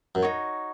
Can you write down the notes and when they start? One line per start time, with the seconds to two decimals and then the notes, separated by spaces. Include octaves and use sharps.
0.15 F#2
0.22 D#4 F#4 C#5